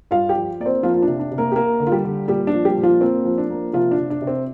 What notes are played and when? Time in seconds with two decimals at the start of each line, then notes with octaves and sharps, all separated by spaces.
0.11 G2 F4 F5
0.29 G4 G5
0.35 F3
0.60 A#3 D5
0.66 C4 C5
0.83 F3 A#3 F4
0.94 F4
1.02 D4
1.08 C3
1.19 D4
1.31 C3
1.38 A#3 A#4
1.52 G4
1.56 A#3 A#4
1.80 D3
1.87 F4
1.92 G3 G4
2.05 D3
2.28 A#2 G3 G4
2.47 D4
2.53 F3
2.65 G3 G4
2.77 A#2
2.83 F3 F4
3.01 A#3 C4
3.25 F3
3.38 D4
3.50 A#3
3.73 C3 F3 F4
3.91 D4
3.98 C3
4.10 D4
4.21 C3
4.27 C4